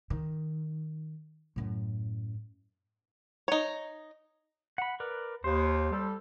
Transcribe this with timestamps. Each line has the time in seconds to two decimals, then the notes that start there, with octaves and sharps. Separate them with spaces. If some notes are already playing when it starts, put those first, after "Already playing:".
0.10 D#3
1.56 F#2 A2
3.48 D#4 C#5
4.78 F#5 B5
5.00 A#4 B4 D5
5.44 D#2 C5
5.91 G3 A4